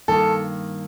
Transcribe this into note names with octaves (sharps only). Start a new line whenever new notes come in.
G2 D#3 A#3 A4